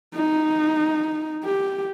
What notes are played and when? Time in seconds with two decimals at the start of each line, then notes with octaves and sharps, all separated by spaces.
0.15 D#4
1.45 G4